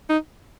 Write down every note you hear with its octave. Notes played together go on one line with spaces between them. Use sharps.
D#4